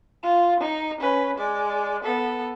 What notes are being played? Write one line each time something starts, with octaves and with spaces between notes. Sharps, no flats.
F4
D#4
C#4 B4
G#3 D5
B3 A4